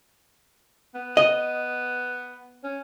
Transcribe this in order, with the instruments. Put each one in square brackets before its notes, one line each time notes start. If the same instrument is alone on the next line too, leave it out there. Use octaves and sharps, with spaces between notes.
[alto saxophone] B3
[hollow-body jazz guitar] D#5
[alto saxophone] C#4